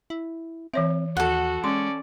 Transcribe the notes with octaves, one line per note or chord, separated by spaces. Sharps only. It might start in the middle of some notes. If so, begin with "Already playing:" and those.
E4
E3 C4 C#5 E5
D#2 F#4 A4 F#5
G#3 C#4 D5 C6